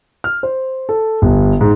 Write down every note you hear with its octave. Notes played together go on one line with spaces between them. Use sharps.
F6
C5
A4
G1
G#2